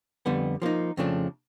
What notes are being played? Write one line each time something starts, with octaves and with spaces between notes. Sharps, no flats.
F2 D3 G3 B3
F3 A#3 D#4
F2 C#3 F3 A3 D4